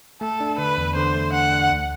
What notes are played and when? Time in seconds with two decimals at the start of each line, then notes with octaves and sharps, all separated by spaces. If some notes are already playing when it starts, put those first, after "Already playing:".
0.21 A3 A4
0.41 D4
0.58 D3 B4
0.78 E2
0.95 D3 C5
1.15 A3
1.33 D4 F#5
1.52 D4
1.71 D2